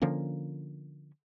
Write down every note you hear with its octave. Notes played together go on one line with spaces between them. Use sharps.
D3 F3 A#3 C#4